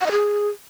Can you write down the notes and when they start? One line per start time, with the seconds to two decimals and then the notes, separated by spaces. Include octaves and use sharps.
0.01 F#5
0.06 D#5
0.11 G#4